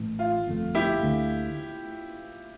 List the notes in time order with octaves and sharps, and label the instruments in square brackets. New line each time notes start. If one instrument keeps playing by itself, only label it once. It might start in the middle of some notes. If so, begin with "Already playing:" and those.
Already playing: [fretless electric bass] A1 A2 E3
[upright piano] F4
[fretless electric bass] G1 F2 D3 A3
[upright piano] E4 G4
[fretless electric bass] D2 D3 A3